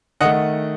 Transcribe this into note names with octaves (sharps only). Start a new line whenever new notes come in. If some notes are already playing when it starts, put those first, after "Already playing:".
D#3 A3 D#5 F#5